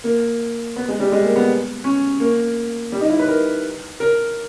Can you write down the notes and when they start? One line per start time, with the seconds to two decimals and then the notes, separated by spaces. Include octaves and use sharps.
0.04 A#3
0.76 B3
0.88 G#3
1.00 G3
1.12 G#3
1.24 A#3
1.36 B3
1.84 C#4
2.20 A#3
2.92 G3
3.01 D#4
3.10 E4
3.19 B4
3.28 A#4
4.00 A#4